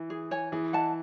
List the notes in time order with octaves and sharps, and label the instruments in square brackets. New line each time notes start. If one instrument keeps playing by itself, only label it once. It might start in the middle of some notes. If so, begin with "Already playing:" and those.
Already playing: [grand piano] E3
[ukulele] G#4
C#5 G#5
[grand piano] E3 [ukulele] G#4
[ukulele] D#5 F#5 A5